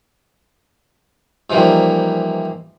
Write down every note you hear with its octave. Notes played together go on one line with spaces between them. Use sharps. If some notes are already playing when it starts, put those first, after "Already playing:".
G#2 E3 F3 G3 A#3